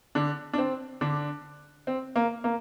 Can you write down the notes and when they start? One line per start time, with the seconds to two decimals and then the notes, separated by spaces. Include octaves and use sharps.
0.15 D3 D4
0.53 D4
0.58 C4
1.01 D3 D4
1.87 C4
2.16 A#3
2.44 A#3